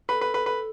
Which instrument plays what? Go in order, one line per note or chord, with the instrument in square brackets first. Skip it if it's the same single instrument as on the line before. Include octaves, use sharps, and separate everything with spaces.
[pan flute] A4 [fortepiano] B4
[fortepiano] B4
B4
B4